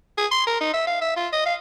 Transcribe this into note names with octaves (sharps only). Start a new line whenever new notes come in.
G#4
C6
A#4
D#4
E5
F5
E5
F4
D#5
F5